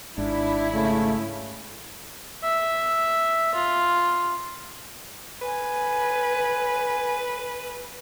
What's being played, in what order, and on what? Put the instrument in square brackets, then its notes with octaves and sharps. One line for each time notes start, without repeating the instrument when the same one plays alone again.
[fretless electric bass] G#1 G#2 [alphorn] D4 [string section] E4
[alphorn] C#3 [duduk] A3
[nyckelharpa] E5
F4
[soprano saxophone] B4 [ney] G#5